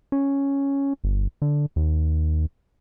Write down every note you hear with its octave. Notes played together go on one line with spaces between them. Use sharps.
C#4
G1
D3
D#2